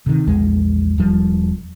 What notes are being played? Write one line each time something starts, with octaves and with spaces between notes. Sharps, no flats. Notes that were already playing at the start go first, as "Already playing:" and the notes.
C3 D#3
A#1 E2 G#3
E1 F3 G3